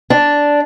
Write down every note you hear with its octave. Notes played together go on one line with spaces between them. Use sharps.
D4